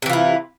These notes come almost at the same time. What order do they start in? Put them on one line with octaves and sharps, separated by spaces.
C3 E3 F4 E4